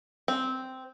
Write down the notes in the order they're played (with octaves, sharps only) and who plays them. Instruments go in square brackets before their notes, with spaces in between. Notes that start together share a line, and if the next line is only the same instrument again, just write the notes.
[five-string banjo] C4